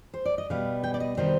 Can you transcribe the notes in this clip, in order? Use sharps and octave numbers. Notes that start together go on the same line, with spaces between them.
C5
D5
D#5
B2 G3 B3 F5
G5
D5
D#5
C3 D#3 G3 B3 C5